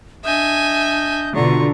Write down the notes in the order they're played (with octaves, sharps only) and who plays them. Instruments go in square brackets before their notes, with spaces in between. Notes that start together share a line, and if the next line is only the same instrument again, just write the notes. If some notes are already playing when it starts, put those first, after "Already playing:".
[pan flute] D4 [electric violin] D#5 G6 [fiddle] E5 G#5
[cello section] B2 D3 [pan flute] F4 [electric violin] A#5 C#6